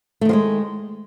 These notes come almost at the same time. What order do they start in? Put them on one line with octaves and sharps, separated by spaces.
A3 D#3 F3 G#3